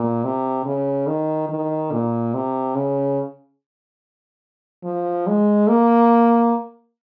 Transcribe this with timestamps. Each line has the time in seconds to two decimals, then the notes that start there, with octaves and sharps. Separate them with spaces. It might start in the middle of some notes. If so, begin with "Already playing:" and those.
Already playing: A#2
0.24 C3
0.65 C#3
1.07 D#3
1.49 D#3
1.91 A#2
2.34 C3
2.75 C#3
4.84 F3
5.27 G#3
5.68 A#3